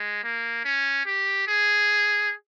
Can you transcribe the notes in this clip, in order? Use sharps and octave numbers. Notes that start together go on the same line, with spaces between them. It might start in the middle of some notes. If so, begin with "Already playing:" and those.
Already playing: G#3
A#3
C#4
G4
G#4